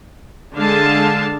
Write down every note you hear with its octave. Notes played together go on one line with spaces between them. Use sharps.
D3 G#3 D4 F5 A5